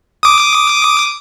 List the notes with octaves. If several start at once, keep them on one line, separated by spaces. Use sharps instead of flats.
D6 D#6